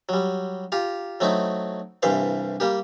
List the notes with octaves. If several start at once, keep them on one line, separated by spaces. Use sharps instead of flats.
F#3 G3
F4 G4 A#5
F#3 A3 C4 D#4 E4
C2 G2 E3 C5 E5 F5
G3 A#3 G4